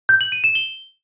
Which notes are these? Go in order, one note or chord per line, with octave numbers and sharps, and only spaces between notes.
G6
F#7
D#7
E7
G7